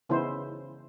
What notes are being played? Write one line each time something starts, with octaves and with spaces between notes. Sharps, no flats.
C#3 E3 B3 D#4 E4 C5